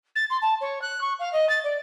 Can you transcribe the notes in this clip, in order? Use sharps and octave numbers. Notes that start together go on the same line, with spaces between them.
A6
C6
A5
C#5
F#6
C#6
F5
D#5
A6
D5